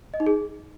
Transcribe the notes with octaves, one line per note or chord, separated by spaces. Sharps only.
D#5
D#4
G#4